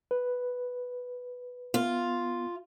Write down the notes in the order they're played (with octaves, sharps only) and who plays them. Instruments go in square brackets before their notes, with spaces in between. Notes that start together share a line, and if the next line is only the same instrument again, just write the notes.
[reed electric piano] B4
[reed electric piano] B3 [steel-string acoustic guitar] F4